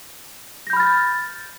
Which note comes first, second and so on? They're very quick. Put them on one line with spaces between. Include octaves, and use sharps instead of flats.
A#6 G6 B5 F6 A6